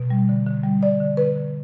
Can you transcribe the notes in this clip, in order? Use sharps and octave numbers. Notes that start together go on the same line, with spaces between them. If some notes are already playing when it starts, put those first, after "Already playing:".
Already playing: B2
G3
D3
D3
G3
D3 D5
D3
D3 B4
D3